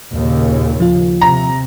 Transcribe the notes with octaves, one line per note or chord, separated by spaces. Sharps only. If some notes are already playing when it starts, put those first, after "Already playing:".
D#2 A#2 C#3
F3 F4
C3 A#5